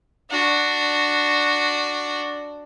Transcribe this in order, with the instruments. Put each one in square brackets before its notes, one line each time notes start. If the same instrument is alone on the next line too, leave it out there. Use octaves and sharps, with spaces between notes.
[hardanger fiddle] D4 F#4